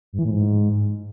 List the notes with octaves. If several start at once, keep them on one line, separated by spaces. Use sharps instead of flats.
G2
E3
A2
G#2